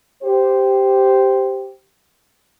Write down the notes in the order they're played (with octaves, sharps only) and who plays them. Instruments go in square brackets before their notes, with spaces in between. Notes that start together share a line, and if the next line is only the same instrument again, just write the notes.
[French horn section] G4 C5